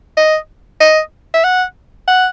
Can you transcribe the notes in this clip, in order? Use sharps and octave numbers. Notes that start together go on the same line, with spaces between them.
D#5
D#5
E5
F#5
F#5